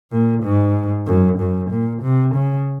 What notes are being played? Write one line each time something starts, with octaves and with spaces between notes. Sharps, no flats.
A#2
G#2
F#2
F#2
A#2
C3
C#3